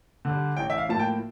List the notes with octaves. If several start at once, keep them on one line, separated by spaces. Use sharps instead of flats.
D3 G3
A1 G5
E5
F5
A2 F3 A#3 A5
G5